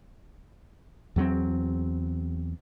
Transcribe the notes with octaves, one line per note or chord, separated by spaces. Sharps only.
E2 F#3 G3 C4